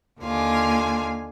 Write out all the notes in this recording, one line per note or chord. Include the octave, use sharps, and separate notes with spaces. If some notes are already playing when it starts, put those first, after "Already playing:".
D#2 D3 F4 G#5